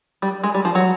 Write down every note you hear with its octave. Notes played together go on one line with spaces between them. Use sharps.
G3
G#3
G3
F3
F#3